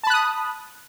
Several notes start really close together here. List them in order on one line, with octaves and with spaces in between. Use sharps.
A5 B5 F#6 D#6